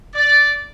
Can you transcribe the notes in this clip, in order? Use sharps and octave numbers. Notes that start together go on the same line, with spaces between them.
D5